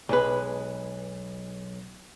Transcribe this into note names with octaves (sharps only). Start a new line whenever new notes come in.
B1 G#3 B4